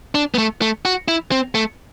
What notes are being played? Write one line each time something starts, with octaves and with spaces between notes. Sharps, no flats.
D4
B3
A3
A3
F#4
E4
C4
A3